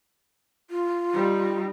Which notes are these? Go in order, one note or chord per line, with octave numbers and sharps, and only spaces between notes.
F4
G3 D#4